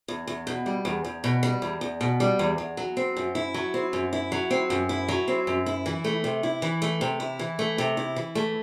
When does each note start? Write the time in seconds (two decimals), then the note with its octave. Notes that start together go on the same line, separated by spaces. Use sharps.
0.08 E2
0.27 E2
0.47 B2
0.66 G3
0.85 E2
1.04 E2
1.24 B2
1.43 G3
1.62 E2
1.81 E2
2.01 B2
2.20 G3
2.39 E2
2.58 E2
2.77 F#3
2.97 C4
3.17 F#2
3.35 E4
3.54 F#3
3.74 C4
3.93 F#2
4.13 E4
4.32 F#3
4.51 C4
4.70 F#2
4.89 E4
5.08 F#3
5.28 C4
5.47 F#2
5.66 E4
5.86 E3
6.04 A3
6.24 C3
6.43 E4
6.62 E3
6.82 A3
7.01 C3
7.20 E4
7.39 E3
7.59 A3
7.78 C3
7.97 E4
8.16 E3
8.35 A3